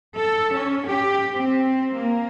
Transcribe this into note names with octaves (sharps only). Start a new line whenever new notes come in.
A4
C#4
G4
C4
A#3